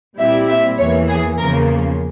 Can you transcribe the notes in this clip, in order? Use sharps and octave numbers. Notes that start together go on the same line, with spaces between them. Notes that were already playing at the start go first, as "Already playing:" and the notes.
A#2 G3 C4 E4 E5
E5
E2 E3 A#3 C#5
G#4
E2 C#3 F3 A#3 A#4